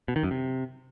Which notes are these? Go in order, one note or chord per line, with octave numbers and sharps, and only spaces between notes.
B2
D#3
F#2
C3